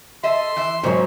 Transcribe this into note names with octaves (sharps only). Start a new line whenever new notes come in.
A4 D#5 E5 C6
E3 E5
G#2 F#3 G3 A#3 C#4